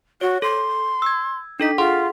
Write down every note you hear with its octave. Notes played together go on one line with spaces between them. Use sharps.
F#4 C#5
A4 C6
E6 G#6
D4 D#4 A4 B6
F4 G#4 F#5 C6